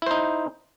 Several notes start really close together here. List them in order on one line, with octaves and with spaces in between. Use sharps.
E4 C5 D#4